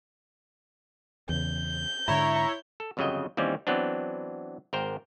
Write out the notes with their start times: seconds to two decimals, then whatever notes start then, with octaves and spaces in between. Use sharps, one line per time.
1.29 E2 C#3 G6
2.08 G#2 D3 E4 C#5 A#5
2.80 A4
2.97 G1 F2 C#3 F#3 D#5 G5
3.37 D#2 E3 G3 C4 C#4
3.67 E3 F#3 B3 C4 D4
4.73 G#1 A#4 C5 G5